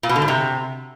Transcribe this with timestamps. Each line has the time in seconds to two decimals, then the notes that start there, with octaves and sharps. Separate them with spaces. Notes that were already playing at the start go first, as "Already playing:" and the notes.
0.03 A#2
0.09 B2
0.16 D3
0.22 G#2
0.28 C3